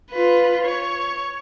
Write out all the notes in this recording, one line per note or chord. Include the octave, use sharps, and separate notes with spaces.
F4 B4
C#5